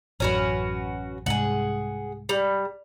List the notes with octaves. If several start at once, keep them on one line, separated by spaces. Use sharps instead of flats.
A1 F#2 C#4 F#4 B4
C2 G#2 G#4 F#5
G3